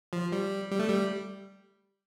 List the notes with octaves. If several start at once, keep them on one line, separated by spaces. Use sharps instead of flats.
F3
G3
G3
A3
G3